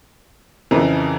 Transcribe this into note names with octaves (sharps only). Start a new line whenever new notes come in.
F2 C#3 E3 A#4